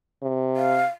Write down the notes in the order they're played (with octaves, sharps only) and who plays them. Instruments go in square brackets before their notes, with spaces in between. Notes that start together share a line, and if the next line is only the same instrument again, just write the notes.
[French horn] C3
[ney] F5